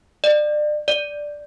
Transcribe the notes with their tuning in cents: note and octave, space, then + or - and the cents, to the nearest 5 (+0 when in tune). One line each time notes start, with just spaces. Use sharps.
D5 +30
D5 +0